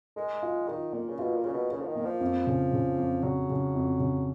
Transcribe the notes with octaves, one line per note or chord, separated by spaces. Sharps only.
G#3 A#4
F4
D#3 F4
A#2 A#3
C#3
B2 F4
A#2
C#3 A#4
B2
C#3 A#4
F3
D#3
A#3
F3
F2
C#3
C#3
F2
C#3 F#3
C#3
F2
C#3